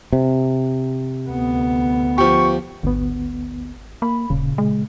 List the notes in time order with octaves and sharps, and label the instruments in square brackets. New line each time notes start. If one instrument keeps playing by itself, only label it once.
[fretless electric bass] C3
[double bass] D2 B3
[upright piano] F3 G4 [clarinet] C#6
[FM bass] G#1 [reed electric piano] D2 B3
[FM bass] A#3 [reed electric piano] B5
[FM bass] D#1 [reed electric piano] A#2 C#3
[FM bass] G#3